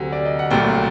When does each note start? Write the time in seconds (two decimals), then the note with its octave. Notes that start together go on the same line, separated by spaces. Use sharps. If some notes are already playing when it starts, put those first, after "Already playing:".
Already playing: D2 C3 F#3
0.12 D5
0.26 D#5
0.39 F#5
0.50 C2 A#2 F#3 A3 G5